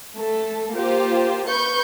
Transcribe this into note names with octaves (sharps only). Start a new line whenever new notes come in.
A3 A4
A#3 F4 G4 C5
B4 C#6 G6